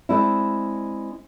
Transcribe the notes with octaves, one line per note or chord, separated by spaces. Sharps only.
G#3 C4 D4 E4